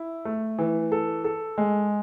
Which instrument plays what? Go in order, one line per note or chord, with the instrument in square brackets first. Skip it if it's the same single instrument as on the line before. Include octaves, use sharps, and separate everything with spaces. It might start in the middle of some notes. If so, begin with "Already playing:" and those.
Already playing: [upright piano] E4
A3
E3
A4
A4
G#3